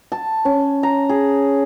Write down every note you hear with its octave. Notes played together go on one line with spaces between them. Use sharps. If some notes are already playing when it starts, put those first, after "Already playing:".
A5
C#4
A#5
G#4